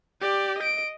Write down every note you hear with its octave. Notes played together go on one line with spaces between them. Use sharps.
G4 D5
D#5 D7